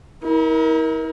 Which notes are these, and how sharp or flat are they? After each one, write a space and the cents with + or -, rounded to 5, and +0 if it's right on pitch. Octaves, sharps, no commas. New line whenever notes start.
E4 -40 A#4 +15